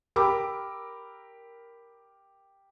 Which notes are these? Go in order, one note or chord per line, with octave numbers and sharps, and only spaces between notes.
G4 A#4 A#5 B5 D6 E6